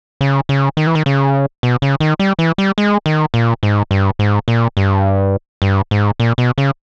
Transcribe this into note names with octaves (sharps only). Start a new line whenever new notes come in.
C#3
C#3
D#3
E3
D#3
C#3
B2
C#3
D#3
G3
E3
G3
G#3
D#3
A#2
G#2
G2
G#2
A#2
G2
G2
G#2
A#2
B2
C#3